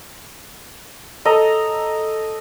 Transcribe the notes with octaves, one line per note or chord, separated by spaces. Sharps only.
A4 D#5 A#5